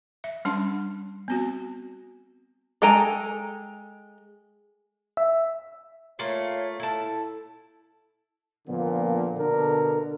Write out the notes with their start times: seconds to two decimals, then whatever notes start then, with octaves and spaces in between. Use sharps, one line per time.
0.24 E5
0.45 G3 C#4 D4 A5 C6
1.28 B3 C4 F#4
2.82 G#3 A4 G5 G#5 A#5
5.17 E5
6.19 A3 A#3 F4 C#5
6.80 E4 A4 A5
8.67 A#2 D3 F3 A#3 B3
9.38 B2 D3 D4 A4 A#4